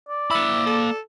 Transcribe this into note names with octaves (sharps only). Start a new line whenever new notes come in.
D5
A#3 E4 B5
A4